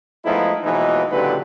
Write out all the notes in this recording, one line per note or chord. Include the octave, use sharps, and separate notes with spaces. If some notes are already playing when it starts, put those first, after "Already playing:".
F3 G#3 A3 B3 D#4 E4
D#2 B2 E3 F3 G#3 D#4
C#2 A#2 D3 F#3 G4 B4